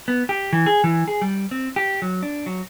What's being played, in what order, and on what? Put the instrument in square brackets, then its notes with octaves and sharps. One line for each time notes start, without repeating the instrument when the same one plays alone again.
[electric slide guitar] B3
G4
E3
G#4
E3
G#4
G3
C4
G4
F#3
D4
F#3